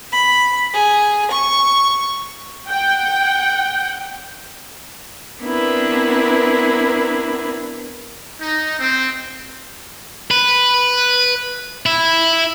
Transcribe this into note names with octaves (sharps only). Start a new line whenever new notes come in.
B5
G#4
C#6
F#5 G5
B3 C4 D4 E4 A#4 B4
D#4
C4
B4
E4